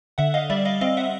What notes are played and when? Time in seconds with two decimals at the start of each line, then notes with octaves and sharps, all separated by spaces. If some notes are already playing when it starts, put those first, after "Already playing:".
0.18 D3 E5 F#5
0.34 D#5 F5
0.50 G3 D5 E5
0.65 D#5 F5
0.81 C4 D#5 F5
0.97 E5 F#5